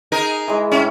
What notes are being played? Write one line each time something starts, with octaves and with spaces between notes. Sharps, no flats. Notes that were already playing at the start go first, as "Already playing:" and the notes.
D#4 G#4 A#4
E3 G#3
A2 A3 C#4